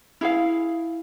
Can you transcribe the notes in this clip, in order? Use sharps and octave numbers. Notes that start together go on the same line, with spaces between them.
E4 G#4 F5